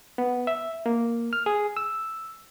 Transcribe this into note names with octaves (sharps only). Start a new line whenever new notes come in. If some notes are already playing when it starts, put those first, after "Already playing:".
B3
E5
A#3
F6
G#4
E6